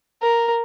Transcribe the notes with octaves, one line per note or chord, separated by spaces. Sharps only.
A#4